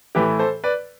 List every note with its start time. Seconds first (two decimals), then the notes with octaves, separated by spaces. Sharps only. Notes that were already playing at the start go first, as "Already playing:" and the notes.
0.15 A2 E3 A3 G4 B4
0.39 A4 C5
0.64 B4 D5